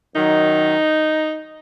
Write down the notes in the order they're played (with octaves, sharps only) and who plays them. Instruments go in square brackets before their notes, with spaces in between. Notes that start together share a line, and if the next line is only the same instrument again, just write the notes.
[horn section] F#2 D#3 F#3 D#4